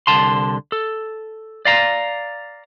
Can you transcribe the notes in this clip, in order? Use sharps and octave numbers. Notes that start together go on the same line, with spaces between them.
C2 D3 A5 C6
A4
D5 F5 A#5